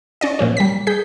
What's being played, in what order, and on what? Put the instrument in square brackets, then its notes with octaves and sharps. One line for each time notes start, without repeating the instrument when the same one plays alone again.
[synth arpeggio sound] C#4 D5 D#5
A#2 F3 C#4
G3 B6
G#4 G6 B6